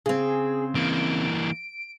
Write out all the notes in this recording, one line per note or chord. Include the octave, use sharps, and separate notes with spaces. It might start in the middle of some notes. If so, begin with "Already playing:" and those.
C#3 C4 G#4
E3 A#3 D7